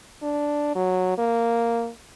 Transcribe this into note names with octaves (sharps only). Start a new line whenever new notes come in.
D4
F#3
A#3